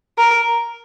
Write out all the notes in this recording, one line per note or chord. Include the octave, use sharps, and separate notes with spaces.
A#4